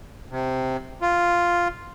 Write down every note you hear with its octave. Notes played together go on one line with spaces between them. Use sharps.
C3
F4